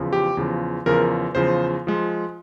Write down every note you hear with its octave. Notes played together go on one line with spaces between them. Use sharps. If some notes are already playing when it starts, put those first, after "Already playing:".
Already playing: E2 C#3 F3
G4
E2 C#3 F3
E2 C#3 F3 A#4
E2 C#3 F3 C5
F3 G#3